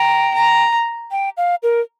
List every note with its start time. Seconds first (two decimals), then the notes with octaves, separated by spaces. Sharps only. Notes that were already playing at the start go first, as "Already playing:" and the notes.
Already playing: G5 A#5
0.34 A#5
1.11 G5
1.37 F5
1.63 A#4